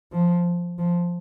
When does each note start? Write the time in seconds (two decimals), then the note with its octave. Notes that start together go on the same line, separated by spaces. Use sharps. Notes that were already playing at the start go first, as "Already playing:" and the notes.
0.12 F3
0.78 F3